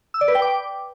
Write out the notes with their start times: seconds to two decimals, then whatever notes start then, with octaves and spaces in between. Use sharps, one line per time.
0.14 E6
0.21 D5
0.28 B4
0.35 G5
0.42 D6